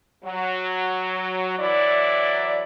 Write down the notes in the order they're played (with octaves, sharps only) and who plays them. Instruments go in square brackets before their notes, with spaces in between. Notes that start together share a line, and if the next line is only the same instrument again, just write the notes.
[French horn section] F#3
E3 F#3 E4 D5